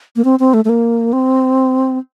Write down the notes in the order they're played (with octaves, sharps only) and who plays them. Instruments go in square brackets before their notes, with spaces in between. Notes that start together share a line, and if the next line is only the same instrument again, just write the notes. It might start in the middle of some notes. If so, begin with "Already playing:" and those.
[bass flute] A#3
C4
C4
A3
A3
A#3
C4